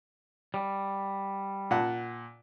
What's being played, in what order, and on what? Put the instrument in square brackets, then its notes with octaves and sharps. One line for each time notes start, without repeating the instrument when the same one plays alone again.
[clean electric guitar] G3
[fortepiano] A#2 F#5 A5